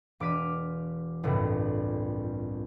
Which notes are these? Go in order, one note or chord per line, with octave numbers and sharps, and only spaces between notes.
E1 D6 F6 B6 D#7
G1 C2 F2 A2